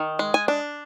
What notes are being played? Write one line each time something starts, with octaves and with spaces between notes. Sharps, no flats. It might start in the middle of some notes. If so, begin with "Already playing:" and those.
Already playing: D#3
G#3
G#5
D4